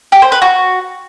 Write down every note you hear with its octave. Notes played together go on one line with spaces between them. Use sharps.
G4
C5
B4
F#4